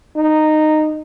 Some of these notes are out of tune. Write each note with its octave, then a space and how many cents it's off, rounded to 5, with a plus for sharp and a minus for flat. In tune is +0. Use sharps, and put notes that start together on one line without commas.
D#4 -10